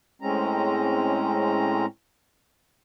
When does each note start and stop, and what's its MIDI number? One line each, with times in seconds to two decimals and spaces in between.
0.22 1.86 45
0.22 1.86 56
0.22 1.86 60
0.22 1.86 61
0.22 1.86 82